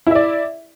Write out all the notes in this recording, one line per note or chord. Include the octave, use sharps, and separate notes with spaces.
E4 D5 E5